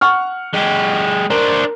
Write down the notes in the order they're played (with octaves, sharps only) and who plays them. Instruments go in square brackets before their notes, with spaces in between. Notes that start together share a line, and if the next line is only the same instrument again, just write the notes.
[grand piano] F#5 C#6 F6
[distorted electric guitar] G#3 G4
[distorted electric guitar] D4 C5 [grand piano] A#4